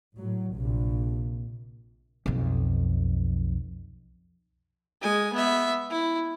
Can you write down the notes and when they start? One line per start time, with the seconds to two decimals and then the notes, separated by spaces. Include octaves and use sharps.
0.17 A2 F#3
0.54 A#1 C3
2.26 B1 F2
5.01 G#3 G#5
5.34 B3 E5
5.90 E4